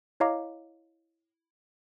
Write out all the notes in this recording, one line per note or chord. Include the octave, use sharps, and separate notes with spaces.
E4 C#5 D#5 F5 A#5 D6